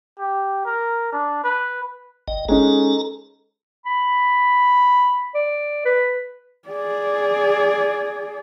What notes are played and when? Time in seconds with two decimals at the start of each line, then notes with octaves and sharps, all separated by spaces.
0.19 G4
0.65 A#4
1.12 D4
1.44 B4
2.28 G1 D#5
2.49 G#3 C#4 D#4 A4 A#5
3.86 B5
5.34 D5
5.85 B4
6.69 G#4 D5